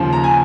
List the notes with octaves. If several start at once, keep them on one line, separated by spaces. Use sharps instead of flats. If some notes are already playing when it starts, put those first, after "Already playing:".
Already playing: D#2 C#3 F3
A#5
G#5